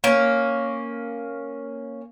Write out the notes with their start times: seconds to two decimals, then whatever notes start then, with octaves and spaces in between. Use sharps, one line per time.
0.04 A#3 C#4